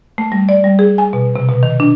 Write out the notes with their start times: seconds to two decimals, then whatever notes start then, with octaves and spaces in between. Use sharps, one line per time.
0.18 A3
0.32 G3
0.49 D5
0.64 G3
0.79 G#4
0.98 G#5
1.13 B2
1.36 C3
1.49 B2
1.63 D#3
1.80 D4